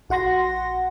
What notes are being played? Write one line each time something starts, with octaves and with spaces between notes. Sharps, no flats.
A#1 F#4 F#5 C6 A#6